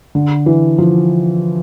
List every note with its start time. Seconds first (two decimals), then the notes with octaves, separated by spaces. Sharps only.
0.15 D3
0.46 E3
0.78 F3